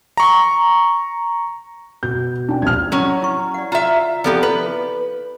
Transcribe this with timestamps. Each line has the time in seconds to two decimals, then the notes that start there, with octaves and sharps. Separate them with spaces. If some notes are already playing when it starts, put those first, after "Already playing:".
0.17 A#5 C#6
2.03 B2 G6
2.49 D4 G5
2.62 A#1 D#2 F6 G#6
2.92 F#3 C#4 E4 F#4 C#6
3.22 E4 C#6
3.54 D5 F#5
3.72 F4 E5 A#5
4.24 F3 B3 E4 G4 A4 D5
4.43 B4